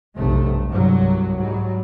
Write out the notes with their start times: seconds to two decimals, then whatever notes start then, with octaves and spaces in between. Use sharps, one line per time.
0.15 F1 B1 G2 C3 A3
0.69 C2 G2 F#3
1.37 G#2 F#3 G3